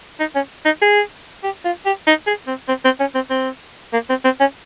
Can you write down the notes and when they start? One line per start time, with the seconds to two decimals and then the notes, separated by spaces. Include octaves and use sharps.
0.20 D#4
0.35 C#4
0.65 D#4
0.82 G#4
1.43 G4
1.65 F4
1.86 G4
2.07 D#4
2.27 G#4
2.47 C4
2.68 C4
2.85 C4
3.00 C#4
3.15 C4
3.30 C4
3.93 A#3
4.09 C4
4.25 C4
4.40 C#4